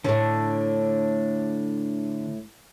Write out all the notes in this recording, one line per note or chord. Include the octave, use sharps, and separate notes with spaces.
A2 D3 A3 D4